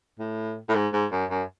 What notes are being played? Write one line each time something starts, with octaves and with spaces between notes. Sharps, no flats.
A2
A2
G#2
G#2
F#2
F#2